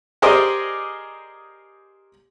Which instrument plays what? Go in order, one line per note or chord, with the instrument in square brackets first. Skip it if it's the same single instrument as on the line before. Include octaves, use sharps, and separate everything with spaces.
[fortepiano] G4 G#4 A#4 C5 D5 D#5